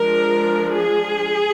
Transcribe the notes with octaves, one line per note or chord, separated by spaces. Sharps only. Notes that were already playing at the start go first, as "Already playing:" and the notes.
Already playing: F3 G#3 D4 A#4
G#4